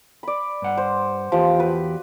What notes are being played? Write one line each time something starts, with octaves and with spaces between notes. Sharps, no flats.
D5 B5
G2 F#5
C5
E2 F3 G4
F#4 B4